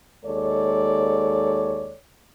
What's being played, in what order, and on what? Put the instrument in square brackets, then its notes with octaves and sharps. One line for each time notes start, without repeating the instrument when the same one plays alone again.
[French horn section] D#2 G#3 A4 C#5 D5